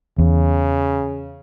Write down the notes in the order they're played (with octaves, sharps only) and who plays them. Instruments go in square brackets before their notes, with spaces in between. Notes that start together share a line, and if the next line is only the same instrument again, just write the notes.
[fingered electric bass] E2 [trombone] C#3